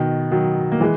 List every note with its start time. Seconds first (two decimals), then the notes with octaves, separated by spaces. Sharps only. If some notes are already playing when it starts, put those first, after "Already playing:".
Already playing: B2 D#3
0.31 D#3 F#3
0.72 A#3
0.80 E3 G#3